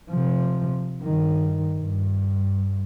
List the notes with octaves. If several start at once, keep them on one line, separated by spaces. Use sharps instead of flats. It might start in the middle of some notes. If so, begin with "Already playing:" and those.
C3 F3
G2 D#3
G2